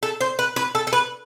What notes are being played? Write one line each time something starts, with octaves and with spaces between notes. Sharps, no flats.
A4
C5
B4
B4
A4
A4
B4